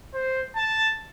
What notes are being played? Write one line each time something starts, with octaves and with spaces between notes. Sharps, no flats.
C5
A5